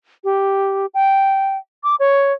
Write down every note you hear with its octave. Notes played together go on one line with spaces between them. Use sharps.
G4
G5
D6
C#5